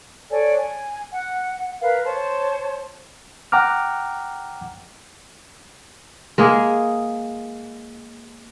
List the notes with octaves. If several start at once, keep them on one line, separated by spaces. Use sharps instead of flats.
A4 C#5 D5 G#5
G#5
F#5
A#4 B4 F5
C5 C#5 A5
F#5 G5 A#5 D6 F6
G#3 A#3 G#4